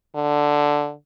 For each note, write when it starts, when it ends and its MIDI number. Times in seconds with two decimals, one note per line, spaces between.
0.16 0.92 50